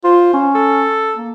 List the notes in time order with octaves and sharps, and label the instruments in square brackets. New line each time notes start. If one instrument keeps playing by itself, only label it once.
[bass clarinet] F4 [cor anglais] C5
[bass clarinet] C#4
[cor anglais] A4
[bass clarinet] A#3